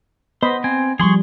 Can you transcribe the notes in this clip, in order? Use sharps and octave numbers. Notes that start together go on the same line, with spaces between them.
B3 C5 D#5 B5
C4 G#5
F3 G3 G#4 C6 C#6